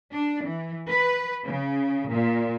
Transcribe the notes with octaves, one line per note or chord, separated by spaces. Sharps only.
D4
E3
B4
C#3
A#2